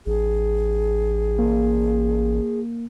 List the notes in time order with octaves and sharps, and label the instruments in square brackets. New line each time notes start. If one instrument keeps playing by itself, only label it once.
[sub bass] A1 [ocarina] G#4
[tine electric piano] A#3